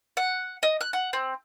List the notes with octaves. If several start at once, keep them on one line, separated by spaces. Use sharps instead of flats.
F#5
D#5
F#6
F#5
C4